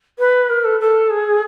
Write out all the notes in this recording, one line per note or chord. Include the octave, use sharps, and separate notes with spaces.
B4
A#4
A4
A4
G#4